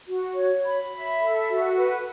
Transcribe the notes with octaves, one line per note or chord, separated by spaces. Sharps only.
F#4
C#5
B5
E5
A4
F#4
B4